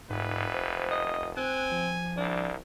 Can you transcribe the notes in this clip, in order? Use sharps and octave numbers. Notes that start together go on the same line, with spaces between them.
F1 G#2 B4
C5
D#5
C4 G#5 F#6
F3
C2 D4